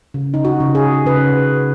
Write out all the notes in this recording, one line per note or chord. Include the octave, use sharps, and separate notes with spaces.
C#3
D#4
F#4
C#3
G#4
C#3 B4